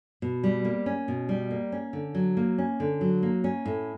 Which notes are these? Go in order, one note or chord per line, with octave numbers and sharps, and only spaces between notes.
B2
G3
A#3
C#4
B2
G3
A#3
C#4
D3
F#3
A#3
C#4
D3
F#3
A#3
C#4
A2